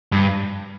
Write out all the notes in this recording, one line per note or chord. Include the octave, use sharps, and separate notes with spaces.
G2